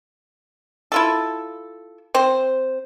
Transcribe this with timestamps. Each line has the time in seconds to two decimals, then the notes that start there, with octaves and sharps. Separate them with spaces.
0.92 E4 F4 A4
2.15 C4 C5